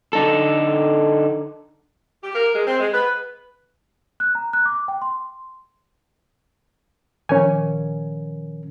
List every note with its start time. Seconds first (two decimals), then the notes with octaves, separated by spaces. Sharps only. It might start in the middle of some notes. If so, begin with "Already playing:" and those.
0.13 D3 D#4 A4
2.23 G4
2.34 A#4
2.54 G#3
2.67 C4
2.80 G#3
2.93 B4
4.20 F#6
4.35 A#5
4.53 F#6
4.66 D6
4.88 G5
5.02 C6
7.29 A#2 D#3 F3 C#4 A#4 G#5